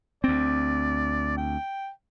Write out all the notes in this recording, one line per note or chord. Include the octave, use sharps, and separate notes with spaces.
D2 C4 D5
G5